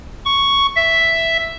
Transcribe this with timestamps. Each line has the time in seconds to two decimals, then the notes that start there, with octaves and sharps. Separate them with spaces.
0.25 C#6
0.76 E5